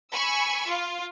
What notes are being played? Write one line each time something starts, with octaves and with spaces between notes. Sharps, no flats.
G#5 B5 C#6 E6
F4